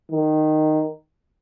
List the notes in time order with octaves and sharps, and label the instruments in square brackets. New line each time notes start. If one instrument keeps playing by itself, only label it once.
[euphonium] D#3